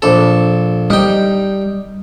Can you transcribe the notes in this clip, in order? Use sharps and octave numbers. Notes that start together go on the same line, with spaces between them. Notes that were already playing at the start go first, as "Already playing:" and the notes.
A#1 A4
G3 D#4 G5